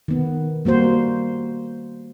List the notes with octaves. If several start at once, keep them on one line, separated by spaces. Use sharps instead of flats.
D#3 B3
G3 A#3 F#4 C5